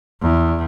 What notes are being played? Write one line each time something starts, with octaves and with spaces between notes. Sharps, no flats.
E2